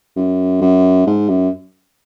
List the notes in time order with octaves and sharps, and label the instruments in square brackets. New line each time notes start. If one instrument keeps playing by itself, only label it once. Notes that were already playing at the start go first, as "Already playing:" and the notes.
[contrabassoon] F#2
F#2
G#2
F#2